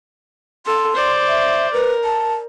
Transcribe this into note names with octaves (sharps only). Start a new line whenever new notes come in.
A4 C6
C5 D5
E5
A#4 B4
A5